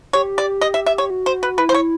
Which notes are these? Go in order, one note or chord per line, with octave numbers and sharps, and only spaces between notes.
G4 C#5
D5
D#5
E5
E5
C#5
F#4
C5
B4
E4 B4
C5
C#5